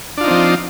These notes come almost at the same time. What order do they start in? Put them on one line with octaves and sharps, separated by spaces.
D4 F4 D#4 C4 F3